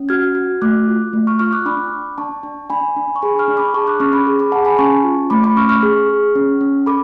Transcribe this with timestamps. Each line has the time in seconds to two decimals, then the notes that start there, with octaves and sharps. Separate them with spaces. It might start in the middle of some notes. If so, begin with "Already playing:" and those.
Already playing: C#4
0.09 F#4 F6 G#6
0.35 F#4
0.62 A3 D6 F#6
0.88 F4
1.13 A3
1.27 C#6 F6
1.39 F4 C#6 F6
1.53 D6 F#6
1.66 D4 B5 D6
1.92 D4
2.18 D4 A5 C#6
2.43 D4
2.70 D4 G#5 B5
2.97 D4
3.16 C#6
3.22 G#4 G#5 B5
3.39 C#6 F6
3.48 D4
3.57 B5 D6
3.74 G#4 A5 C#6
3.87 D6 F#6
4.00 C#4 C#6 F6
4.13 B5 D6
4.27 G#4
4.39 B5 D6
4.52 G#4 F#5 A5
4.65 G#5 B5
4.78 C#4 A5 C#6
5.04 F4
5.30 A3 B5 D6
5.43 B5 D6
5.56 C#4 C#6 F6
5.69 C#6 F6
5.83 G#4
6.09 G#4
6.35 C#4
6.61 C#4
6.86 A4 B5 D6